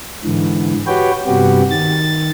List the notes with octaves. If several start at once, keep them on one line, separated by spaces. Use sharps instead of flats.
G#2 D3 E3
F#4 G4 B4 C#5 G5
G2 C3 G3 B3 F#4 G4
D#3 A6